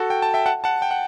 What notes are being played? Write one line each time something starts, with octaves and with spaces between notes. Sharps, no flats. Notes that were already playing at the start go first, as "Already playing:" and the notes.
Already playing: F#4 A4
G5
A5
E5 G5
F#5 A5
F#5 A5
G5
F#5